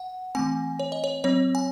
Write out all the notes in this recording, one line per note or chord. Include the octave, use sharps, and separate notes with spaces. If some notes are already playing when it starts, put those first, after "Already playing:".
Already playing: F#5
E3 A3 C4 G#5
C#5
D#5
C#5
F#3 C4 C#5
G#5